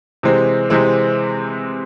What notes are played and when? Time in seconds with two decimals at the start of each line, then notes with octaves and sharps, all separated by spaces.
0.23 C3 E3 G#3 C4
0.70 C3 E3 G#3 C4